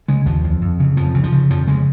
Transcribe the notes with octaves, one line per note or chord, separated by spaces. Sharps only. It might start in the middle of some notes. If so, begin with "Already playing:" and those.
C#3 G#3
D#2 F3
F2
F2
C#3
F2 F3
C#3
F3
C#3
F2 F3
C#3 G#3